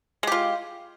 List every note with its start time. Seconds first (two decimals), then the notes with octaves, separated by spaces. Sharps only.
0.23 G#3
0.27 G4
0.32 F4